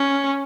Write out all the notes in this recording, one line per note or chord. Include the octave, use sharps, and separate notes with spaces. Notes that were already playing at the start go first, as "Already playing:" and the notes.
Already playing: C#4